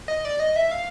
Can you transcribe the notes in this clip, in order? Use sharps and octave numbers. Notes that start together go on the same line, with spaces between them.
D#5
D5
D#5
E5
F5